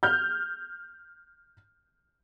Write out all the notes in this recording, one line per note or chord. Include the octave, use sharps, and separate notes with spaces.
F6 G6